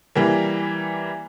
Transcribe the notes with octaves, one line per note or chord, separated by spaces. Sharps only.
E3 G3 A#3